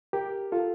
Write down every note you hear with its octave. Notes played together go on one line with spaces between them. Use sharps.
G4 A#4
F4 A4